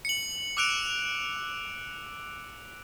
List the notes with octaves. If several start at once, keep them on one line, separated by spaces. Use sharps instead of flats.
C#7 F#7
D6 E6 F#6 D7 F7